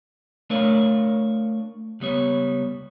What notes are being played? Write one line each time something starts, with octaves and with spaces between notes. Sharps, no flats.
A3 D4 A#4 C#5 D5 F5
C#2 G3 B3 C#5